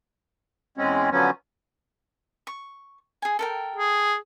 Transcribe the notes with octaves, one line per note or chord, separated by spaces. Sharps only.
E2 G#3 C4 C#4
D3 F3 F#3 B3 C#4
C#6
G#4 G#5
A4 A#4 G5
G#4